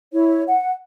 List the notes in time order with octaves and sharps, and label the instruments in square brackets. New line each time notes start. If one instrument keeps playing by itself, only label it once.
[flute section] E4 C#5
F#5